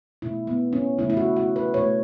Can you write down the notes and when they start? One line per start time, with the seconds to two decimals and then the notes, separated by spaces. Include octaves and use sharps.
0.22 B2 A3 E4
0.47 B3
0.73 C#4
0.98 C#3 A3 E4
1.10 E4
1.17 F#4
1.36 F#4
1.56 B4
1.74 B2 A3 C#5